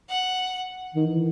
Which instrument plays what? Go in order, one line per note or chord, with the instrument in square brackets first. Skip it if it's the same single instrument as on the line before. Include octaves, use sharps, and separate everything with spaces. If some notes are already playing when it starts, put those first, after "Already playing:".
[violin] F#5
[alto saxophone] D#3
E3